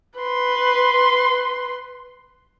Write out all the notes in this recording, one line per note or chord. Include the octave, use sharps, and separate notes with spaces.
B4 C6